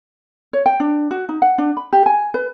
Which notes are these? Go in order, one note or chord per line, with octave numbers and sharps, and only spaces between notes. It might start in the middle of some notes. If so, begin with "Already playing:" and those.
C#5
G5
D4
F#4
D#4
F#5
D4
B5
G4
G#5
B4